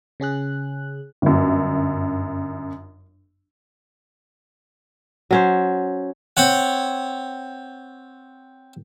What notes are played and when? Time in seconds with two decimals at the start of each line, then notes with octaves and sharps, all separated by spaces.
0.20 C#3 C#4 G#4 F#6
1.22 G1 F#2
5.31 F#3 C#4 C5
6.37 C4 C#5 F#5